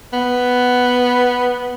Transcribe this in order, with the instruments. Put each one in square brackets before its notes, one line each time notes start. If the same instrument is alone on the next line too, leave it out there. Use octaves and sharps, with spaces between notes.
[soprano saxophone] B3